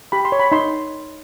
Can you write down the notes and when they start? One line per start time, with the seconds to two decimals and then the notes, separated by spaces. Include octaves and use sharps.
0.12 G4 B5
0.25 C6
0.32 C#5
0.39 B5
0.52 D#4 C6